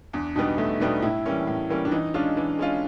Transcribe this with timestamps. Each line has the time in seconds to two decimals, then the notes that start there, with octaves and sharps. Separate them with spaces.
0.13 E2 D4
0.35 B2 G3 B3 D4 D#4
0.58 E2 A3
0.80 B2 G3 B3 D4 D#4
1.02 A2 E4
1.26 E3 G3 A#3 C#4
1.47 A2
1.70 E3 G3 A#3 C#4
1.85 D4
1.91 E3 D#4
2.14 G#3 C#4 D4 F4
2.37 E3
2.59 G#3 C#4 F4